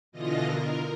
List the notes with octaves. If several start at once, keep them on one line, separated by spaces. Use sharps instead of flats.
B2 D3 E3 F4 D#5 A#6
A#4